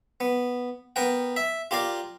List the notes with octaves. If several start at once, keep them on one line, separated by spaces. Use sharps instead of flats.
B3
B3 A#4 F#5 G5
E5
F4 G4 A#4 D5 F5